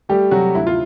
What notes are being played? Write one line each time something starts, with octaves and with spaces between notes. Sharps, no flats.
G3 A3 G4
C3 F#3 F#4
D2 E4
F4